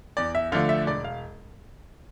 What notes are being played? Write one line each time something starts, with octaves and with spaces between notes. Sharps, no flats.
E2 D5
E5
D3 F3 A3 D4 F5
E5
E1 D5
F5